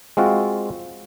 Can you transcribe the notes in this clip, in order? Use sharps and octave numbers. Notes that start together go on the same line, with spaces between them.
G#3 C4 F4 F#4